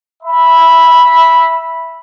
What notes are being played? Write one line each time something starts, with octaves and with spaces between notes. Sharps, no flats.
E5 B5